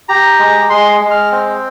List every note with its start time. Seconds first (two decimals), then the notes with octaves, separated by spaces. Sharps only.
0.09 G4 A#5
0.39 G#3
0.70 G#3 C6
1.01 G#3
1.11 F6
1.32 C4